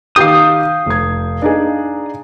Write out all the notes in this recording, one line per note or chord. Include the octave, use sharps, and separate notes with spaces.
D#3 G4 F5 D#6 G6
F1 G#6
D4 D#4 G#4